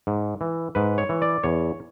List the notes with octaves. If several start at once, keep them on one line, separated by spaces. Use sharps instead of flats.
G#2
E3
G#2 B4
C#5
E3
D5
E2 C#5